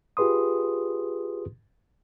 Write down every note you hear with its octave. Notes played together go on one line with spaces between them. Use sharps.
F4 G4 G#4 B4 C6 D#6